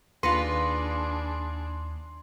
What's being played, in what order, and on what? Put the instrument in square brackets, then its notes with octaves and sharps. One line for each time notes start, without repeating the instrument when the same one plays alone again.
[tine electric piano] D#2 A#6 C#7 [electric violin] D4 G#4 [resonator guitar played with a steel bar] F4 B4 [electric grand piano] C6